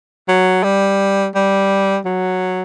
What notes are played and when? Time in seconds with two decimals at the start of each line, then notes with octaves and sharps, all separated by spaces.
0.28 F#3
0.63 G3
1.35 G3
2.05 F#3